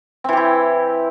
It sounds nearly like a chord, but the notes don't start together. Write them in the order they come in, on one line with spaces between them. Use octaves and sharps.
C4 E3 G4 E4